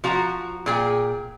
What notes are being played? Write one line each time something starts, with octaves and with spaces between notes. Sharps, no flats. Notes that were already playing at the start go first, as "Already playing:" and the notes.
F3 F#4 A#5
A#2 G#4 G5